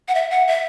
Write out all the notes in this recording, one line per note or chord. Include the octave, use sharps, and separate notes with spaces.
F#5
E5
F#5
E5